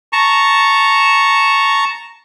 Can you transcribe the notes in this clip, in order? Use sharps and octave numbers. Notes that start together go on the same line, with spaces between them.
A5 A#5 C#6